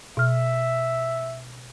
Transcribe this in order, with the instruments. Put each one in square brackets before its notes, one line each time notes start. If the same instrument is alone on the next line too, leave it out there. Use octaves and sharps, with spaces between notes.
[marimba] B2 F6 [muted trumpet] E5